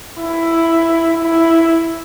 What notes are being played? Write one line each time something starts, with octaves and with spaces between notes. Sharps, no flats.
E4
E4